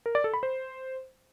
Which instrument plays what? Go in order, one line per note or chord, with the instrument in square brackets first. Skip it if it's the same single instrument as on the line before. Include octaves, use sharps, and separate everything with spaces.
[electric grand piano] A#4
D5
A4
B5
C5